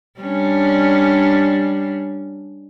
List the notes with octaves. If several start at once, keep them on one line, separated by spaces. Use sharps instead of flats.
G3 C#4 D4